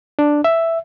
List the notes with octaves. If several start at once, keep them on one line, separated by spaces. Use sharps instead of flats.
D4
E5